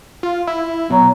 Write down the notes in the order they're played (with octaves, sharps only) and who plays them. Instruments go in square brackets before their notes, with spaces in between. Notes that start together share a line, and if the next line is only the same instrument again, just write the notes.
[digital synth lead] F4
E4
[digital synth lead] B2 [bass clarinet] F#3